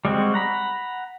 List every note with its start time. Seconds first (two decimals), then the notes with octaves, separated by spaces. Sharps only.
0.05 G3 G#3 C4 F#4
0.34 F#5 A#5 B5